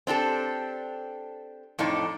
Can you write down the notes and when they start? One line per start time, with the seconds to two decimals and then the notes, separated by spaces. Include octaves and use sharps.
0.07 C4 D4 G4 A4
1.79 F2 A2 D4 D#4